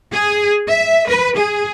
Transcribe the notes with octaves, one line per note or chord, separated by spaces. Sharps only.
G#4
E5
B4
G#4